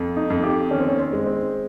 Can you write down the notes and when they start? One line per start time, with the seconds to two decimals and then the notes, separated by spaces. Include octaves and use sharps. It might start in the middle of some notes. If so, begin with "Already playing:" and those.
Already playing: F2
0.16 D#4
0.30 F2
0.43 G4
0.71 D#3 C#4
0.80 C4
0.88 C#4
0.99 C4
1.13 G#3
1.26 C4